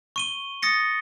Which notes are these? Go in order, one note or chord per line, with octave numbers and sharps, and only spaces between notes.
C#6 D#7 G7
D#6 A6 A#6 C#7